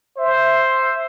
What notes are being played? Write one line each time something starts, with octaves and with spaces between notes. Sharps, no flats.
C5 E5